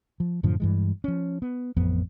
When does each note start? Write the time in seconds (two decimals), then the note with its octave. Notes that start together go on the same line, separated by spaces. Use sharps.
0.20 F3
0.43 F#2 A2 D3 F3
0.60 G2 E3 G#3
1.04 F3 C#4
1.42 B3
1.76 A1 F2 B3